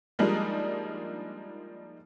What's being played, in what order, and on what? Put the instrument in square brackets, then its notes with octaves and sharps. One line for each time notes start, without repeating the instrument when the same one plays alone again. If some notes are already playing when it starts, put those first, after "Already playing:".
[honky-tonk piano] F3 G3 G#3 A#3 D4 D#4